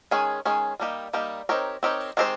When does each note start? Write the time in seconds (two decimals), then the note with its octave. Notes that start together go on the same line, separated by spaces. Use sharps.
0.11 D#3 G#3 C#4 G#4
0.45 D#3 G#3 C#4 G#4
0.79 G3 A#3 D#4 G4
1.13 G3 A#3 D#4 G4
1.49 C4 D#4 G4 A#4 C#5
1.83 C4 D#4 G4 A#4 C#5
2.17 D#3 G#3 C4 G4 C5